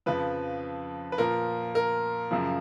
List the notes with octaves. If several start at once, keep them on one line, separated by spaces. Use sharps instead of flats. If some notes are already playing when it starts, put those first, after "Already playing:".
F2 C#3 F3 B4
B4
A#2 F3 A#4
A#4
F#2 C#3 F3